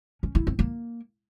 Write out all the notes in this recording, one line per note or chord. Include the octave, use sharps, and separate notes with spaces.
C#4
E4
C4
A#3